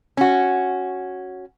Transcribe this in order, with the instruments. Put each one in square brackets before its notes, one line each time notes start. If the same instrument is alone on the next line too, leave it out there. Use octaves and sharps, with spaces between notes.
[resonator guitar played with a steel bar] C#4 F#4